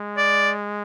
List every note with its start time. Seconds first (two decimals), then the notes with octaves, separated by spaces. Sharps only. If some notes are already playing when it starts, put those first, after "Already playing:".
Already playing: G#3
0.17 D5